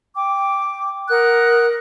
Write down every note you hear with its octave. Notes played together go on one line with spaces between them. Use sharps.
G5 D6
A#4 F#5 D#6 F#6